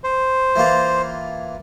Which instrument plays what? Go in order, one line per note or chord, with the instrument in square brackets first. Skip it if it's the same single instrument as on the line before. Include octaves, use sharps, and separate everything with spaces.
[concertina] C5
[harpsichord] E3 A#3 F4